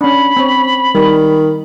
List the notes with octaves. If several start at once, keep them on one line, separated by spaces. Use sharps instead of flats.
C#4 D4 B5
C4 C#5
D#3 G3